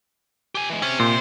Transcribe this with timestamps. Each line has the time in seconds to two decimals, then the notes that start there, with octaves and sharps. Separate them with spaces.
0.55 G4 G#5
0.70 E3 G#3
0.82 C3 C#4
1.00 A#2 C5